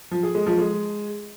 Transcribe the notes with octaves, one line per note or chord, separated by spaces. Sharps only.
F3
G#4
G#3
F3
G#3